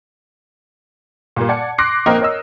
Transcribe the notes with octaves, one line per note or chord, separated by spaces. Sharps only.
A#2 G3 A#3
D5 F#5 A5 G#6 C#7
C6 D6 F#6 A#6 C7 D7
A#1 A#3 C4 A#4 D#5 G5
A#4 C#5 D#5 E6